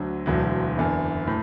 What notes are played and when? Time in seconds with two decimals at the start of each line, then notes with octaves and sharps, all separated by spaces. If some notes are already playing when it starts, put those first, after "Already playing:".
Already playing: D2 D3 F#3
0.26 E1 D2 D3 F#3
0.77 F#1 E2 D3
1.27 A2